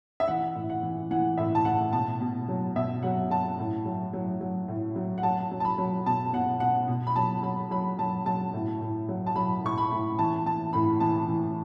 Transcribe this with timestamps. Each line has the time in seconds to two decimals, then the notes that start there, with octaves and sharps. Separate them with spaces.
0.20 E5
0.28 E3 F#5
0.55 A2
0.70 F#5
0.83 E3
1.11 E3 F#5
1.38 A2 E5
1.55 A5
1.65 A2 F#5
1.93 B2 A5
2.21 B2
2.48 F#3
2.76 B2 E5
3.03 F#3 F#5
3.30 F#3 A5
3.59 A2
3.85 F#3
4.13 F#3
4.41 F#3
4.68 A2
4.96 F#3
5.18 F#5
5.23 F#3 A5
5.51 F#3
5.60 A5
5.65 B5
5.78 F#3
6.06 B2 A5
6.33 B2 F#5
6.60 B2 F#5
6.88 B2
7.07 B5
7.16 F#3 A5
7.43 F#3 B5
7.71 F#3 B5
7.99 F#3 A5
8.26 F#3 A5
8.53 A2
8.81 A2
9.09 F#3
9.26 A5
9.35 F#3 B5
9.64 A2 C#6
9.78 B5
9.91 A2
10.19 E3 A5
10.46 E3 A5
10.73 A2 B5
11.00 E3 A5
11.28 E3